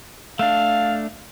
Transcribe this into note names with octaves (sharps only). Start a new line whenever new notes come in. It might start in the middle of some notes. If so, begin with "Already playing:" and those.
A3 D4 F5